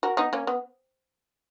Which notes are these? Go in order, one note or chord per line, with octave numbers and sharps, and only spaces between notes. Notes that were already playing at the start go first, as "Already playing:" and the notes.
F#4 A#4
B3 D#4
A#3 C#4
B3